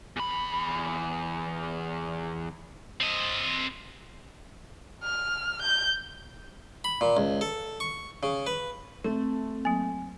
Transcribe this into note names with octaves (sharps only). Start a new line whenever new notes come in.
E2 B5
C4 D#5
F6
G6
B5
A#2
C#2
A4
C#6
C#3
B4
A3 C4
F#3 A#3 G#5